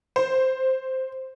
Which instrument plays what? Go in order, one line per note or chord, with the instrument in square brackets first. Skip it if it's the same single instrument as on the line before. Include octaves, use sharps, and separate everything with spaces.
[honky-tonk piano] C5